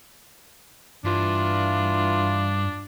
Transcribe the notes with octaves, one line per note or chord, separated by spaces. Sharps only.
G2 E3 D4 F4